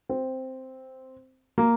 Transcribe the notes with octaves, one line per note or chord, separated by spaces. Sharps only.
C4
A#3